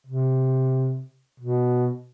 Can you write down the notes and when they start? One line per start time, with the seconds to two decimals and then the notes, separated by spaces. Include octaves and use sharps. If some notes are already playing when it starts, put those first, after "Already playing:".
0.07 C3
1.40 B2